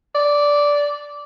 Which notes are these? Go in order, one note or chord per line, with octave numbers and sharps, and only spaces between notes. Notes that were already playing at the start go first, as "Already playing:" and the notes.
D5